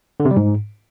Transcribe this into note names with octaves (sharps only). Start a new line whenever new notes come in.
D3
C3
G3
G#2